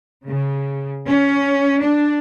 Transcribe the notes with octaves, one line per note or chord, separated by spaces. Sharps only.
C#3
C#4
D4